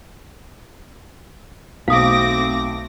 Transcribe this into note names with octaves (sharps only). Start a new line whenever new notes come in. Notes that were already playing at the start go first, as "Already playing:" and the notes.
B1 A3 C4 F5 D6 D#6 A#6